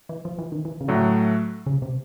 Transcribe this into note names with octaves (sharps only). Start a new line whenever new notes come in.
E3
F3
E3
D#3
E3
C#3
A2 D3 F#3 A3
C#3
C3